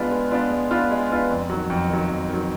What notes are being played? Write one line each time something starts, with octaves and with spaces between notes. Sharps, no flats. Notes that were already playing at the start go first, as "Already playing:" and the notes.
Already playing: G#3 B3 D4 F4 B4
G#3
B3 D4 F4 B4
G#3
B3 D4 F4 B4
G#3
B3 D4 F4 B4
F2
D#3 F#3
F2
D#3 F#3
F2
D#3 F#3